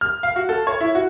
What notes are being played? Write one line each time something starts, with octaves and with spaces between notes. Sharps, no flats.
F6
F5
F#4
A4
C#5
E4
F#4